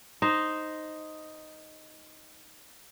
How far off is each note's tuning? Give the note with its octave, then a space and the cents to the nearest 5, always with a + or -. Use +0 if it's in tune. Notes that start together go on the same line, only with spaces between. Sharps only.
D#4 +0 C5 +0